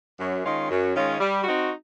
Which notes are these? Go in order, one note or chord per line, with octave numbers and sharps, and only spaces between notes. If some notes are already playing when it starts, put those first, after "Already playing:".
F#2
D#3 G#3 C#4 F4
F#2
D#3 G#3 C#4 F4
G3
C4 D#4 F#4